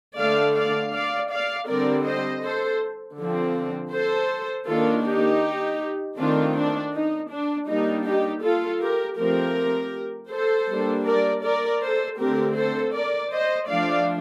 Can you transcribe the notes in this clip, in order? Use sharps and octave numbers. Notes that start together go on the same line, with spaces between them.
D3 A3 D4 D5 F5
D5 F5
D5 F5
D5 F5
D3 G3 C4 A#4 D5
C5 D#5
A4 C5
D3 F3 C4
A4 C5
D#3 A#3 D4 F4 A4
D#4 G4
D#3 A3 C4 D4 F4
D4
D#4
D4
G3 A#3 D4 D#4
D#4 G4
F4 A4
G4 A#4
F3 A3 C4 G4 A#4
A4 C5
G3 A#3 D4
A#4 D5
A#4 D5
A4 C5
D3 A3 C4 G4 A#4
A4 C5
A#4 D5
C5 D#5
F3 A3 D4 D5 F5